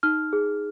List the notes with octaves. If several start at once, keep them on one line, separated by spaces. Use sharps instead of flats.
D#4 F6
G#4